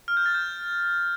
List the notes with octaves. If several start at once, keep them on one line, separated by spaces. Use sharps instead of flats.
F6
G6
A6
G6